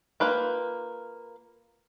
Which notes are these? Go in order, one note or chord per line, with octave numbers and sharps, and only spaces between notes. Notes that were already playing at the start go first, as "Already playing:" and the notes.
A#3 F4 B4 G5